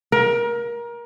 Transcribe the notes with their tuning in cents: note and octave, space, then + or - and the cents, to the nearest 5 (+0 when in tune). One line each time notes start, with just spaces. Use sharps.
A#4 +25